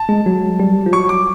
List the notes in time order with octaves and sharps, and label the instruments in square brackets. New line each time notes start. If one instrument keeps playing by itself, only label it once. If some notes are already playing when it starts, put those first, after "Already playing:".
Already playing: [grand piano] A5
[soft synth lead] G#3
F#3
G3
F3
[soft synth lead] F#3 [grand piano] C#6
[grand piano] D6